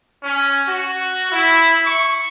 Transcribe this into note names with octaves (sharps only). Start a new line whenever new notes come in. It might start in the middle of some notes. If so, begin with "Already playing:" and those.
C#4
F#4
E4
C#6